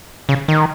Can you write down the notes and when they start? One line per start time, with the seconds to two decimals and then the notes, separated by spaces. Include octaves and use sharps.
0.29 C#3
0.48 D#3